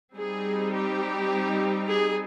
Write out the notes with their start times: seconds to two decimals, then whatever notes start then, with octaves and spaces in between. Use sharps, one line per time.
0.17 G3 C4 D#4 G#4
0.74 G4
1.87 G#4